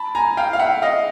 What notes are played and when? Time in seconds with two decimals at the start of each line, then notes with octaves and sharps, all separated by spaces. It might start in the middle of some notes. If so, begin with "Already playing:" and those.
Already playing: A5 B5
0.15 G#5 A#5
0.37 F5 G5
0.53 F5
0.59 E5 F#5
0.82 D#5 F5